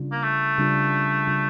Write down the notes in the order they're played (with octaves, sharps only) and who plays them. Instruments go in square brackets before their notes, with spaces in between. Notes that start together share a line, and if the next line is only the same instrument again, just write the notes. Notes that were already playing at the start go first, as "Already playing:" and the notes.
Already playing: [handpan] C#3 G3 D4 F4
[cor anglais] A#3
A3
[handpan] C#3 G3 D4 F4
C#3 G3 D4 F4